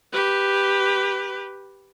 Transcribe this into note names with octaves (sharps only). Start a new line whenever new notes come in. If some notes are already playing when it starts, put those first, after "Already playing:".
G4 B4